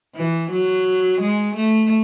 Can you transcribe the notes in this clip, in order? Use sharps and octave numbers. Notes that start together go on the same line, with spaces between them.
E3
F#3
G#3
A3